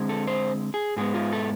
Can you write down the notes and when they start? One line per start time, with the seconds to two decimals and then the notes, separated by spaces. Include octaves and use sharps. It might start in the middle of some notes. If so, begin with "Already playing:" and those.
Already playing: D3 G#3 C4
0.09 A4
0.27 C5
0.74 G#4
0.96 G#2 G#3 B3 G#4
1.14 F4
1.33 A4